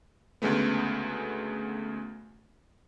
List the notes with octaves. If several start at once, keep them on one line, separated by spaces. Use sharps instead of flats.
D2 C#3 G#3 A3 B3